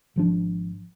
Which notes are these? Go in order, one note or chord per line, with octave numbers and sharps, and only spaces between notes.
G#1 F3 D4